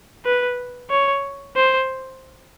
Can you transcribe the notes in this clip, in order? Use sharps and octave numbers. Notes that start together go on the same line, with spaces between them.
B4
C#5
C5